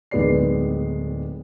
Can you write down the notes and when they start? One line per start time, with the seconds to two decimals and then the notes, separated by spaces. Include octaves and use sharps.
0.11 D1 D#3 G#3 B3 D5 C7